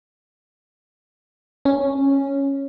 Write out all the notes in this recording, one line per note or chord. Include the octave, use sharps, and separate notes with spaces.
C#4